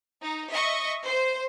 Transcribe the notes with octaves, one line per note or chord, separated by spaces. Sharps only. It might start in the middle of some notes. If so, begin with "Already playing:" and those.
D#4
D#5 E5 C#6
C5